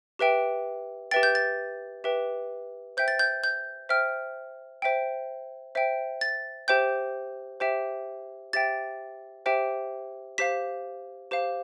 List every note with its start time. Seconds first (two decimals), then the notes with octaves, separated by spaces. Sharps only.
0.19 G4 B4 E5 G5
1.11 G4 B4 E5 G5 A6
1.23 G6
1.35 A6
2.04 G4 B4 E5 G5
2.97 C5 E5 G5 G6
3.08 A6
3.19 G6
3.44 G6
3.89 C5 E5 G5 F6
4.82 C5 E5 G5
5.75 C5 E5 G5
6.21 A6
6.68 G4 C5 E5 G5 G6
7.60 G4 C5 E5 G5
8.53 G4 C5 E5 G5 A6
9.46 G4 C5 E5 G5
10.38 G4 C5 F5 B6
11.31 G4 C5 F5